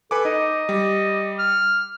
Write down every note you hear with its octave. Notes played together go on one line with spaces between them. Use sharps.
A4 B4 G#5 D6
D#4 D#5
G3
F6